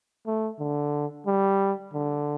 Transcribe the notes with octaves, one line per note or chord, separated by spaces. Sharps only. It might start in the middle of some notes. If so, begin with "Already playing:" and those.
A3
D3
G3
D3